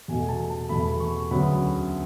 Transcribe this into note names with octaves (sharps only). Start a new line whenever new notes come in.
E2 B2 A3 G#5
A5
A5
E2 B2 A3 B5
C#6
D2 C#3 F#3 B3 B5